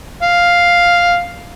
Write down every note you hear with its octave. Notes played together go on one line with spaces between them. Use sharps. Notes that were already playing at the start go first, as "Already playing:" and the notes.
F5